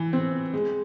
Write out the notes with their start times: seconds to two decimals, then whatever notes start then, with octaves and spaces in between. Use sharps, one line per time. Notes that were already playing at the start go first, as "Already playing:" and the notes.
Already playing: E3
0.13 C4
0.54 G#3